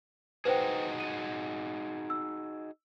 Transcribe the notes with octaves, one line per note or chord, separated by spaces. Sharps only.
D#4 F#4 G#4 B4 C5 G5
D#7
E6